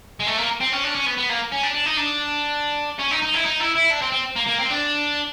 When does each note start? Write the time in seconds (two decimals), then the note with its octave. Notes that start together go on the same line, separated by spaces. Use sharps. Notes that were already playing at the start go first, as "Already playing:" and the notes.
0.20 G#3
0.27 A3
0.38 A#3
0.61 C4
0.72 C#4
0.84 D4
0.95 C#4
1.06 B3
1.17 B3
1.29 A#3
1.52 C#4
1.63 D4
1.74 D4
1.86 D#4
1.97 D4
2.99 C#4
3.11 D#4
3.22 D#4
3.34 E4
3.45 D#4
3.60 E4
3.75 E4
3.91 D4
4.02 C4
4.12 C4
4.36 A#3
4.47 A#3
4.58 C4
4.70 D4